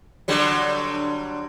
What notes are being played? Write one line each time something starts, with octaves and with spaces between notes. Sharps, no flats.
D3 F#3 G3